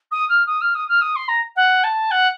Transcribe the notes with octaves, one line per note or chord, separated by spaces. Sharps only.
D#6
F6
D#6
F6
D#6
F6
D#6
C6
A#5
F#5
A5
F#5